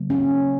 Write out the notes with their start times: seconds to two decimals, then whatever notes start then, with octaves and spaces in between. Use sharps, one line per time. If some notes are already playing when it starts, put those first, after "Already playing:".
Already playing: C#3 F#3 A#3
0.10 C#4